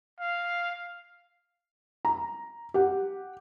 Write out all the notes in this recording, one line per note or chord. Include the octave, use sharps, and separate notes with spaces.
F5
A#5
G4 F#5